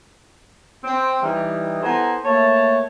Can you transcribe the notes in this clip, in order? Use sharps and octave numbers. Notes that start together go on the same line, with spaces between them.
C4
E3 G3 D#4
B3 E4 A4 C5 G#5 A#5
A3 A#3 G4 C#5 E5 A5